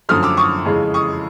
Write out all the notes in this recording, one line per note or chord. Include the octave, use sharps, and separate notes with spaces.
F#2 D3 F3 A3 D#6 F6
D6 E6
C#6 D#6
F2 C#3 E3 G#3
C#6 D#6